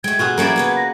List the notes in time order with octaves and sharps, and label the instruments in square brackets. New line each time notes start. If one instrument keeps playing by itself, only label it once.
[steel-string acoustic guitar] G#3 A3 [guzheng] G5 [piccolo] G#6
[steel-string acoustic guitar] B2 [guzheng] F4 F#4 G#4
[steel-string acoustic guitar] F3 G3 E4 [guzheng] A#3 C#4 D5
[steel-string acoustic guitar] C#3 B3 B4
[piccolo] A#6